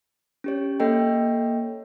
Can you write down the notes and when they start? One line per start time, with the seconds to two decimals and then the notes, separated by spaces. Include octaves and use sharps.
0.44 C#4 G4 C#5
0.80 A#3 A4 C#5 D#5 G5